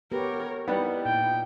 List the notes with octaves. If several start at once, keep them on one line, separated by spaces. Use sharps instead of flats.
B3 G4 A#4 B4 C#5
G3 B3 D#4 E4 F#5
A#2 G5